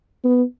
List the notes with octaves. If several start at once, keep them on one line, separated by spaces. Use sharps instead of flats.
B3